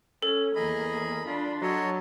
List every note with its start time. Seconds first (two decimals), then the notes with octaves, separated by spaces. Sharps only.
0.22 C#4 A4
0.55 E2 A#3 G#4 D#5 B5
1.25 D4 F4 B5 C6
1.62 F#3 A4 C#5 D#5